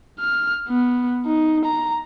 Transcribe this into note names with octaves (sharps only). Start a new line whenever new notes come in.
F6
B3
D#4
A#5